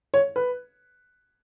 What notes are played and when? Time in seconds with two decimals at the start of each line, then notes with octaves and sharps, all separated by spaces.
0.14 C#5
0.36 B4